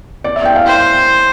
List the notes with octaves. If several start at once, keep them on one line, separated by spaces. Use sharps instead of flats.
D5
E5
G5
F5
C5 G5